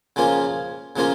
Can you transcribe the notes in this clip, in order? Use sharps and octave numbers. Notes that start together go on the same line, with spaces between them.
C#3 F3 A#3 C#4 F4
C#3 F3 A#3 C#4 F4